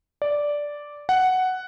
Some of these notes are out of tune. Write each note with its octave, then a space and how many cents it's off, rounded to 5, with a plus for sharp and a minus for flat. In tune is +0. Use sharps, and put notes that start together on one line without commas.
D5 -5
F#5 +5